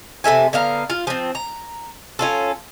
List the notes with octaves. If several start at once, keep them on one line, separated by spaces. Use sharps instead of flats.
C3 A4 E5 G#5
D3 B3 F5 A#5
F4
F3 C4
A#5
C#4 F4 A4